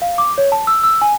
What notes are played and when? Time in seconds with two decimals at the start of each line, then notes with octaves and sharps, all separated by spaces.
0.02 F5
0.18 D6
0.38 C#5
0.52 A5
0.67 E6
0.84 E6
1.02 G#5